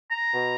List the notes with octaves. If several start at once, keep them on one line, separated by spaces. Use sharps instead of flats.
A#5
B2